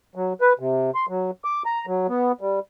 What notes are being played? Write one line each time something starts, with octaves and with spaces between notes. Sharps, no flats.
F#3
B4
C3
C6
F#3
D6
A#5
F#3
B3
G3